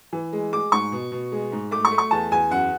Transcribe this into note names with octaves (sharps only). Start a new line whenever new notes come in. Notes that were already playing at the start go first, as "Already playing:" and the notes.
E3
G#3
G#3 D6
G#2 C#6
B2
B2
G#3
G#2
A3 D6
C#6
A3
C#6
E2 A5
E2 G#5
F#2 F#5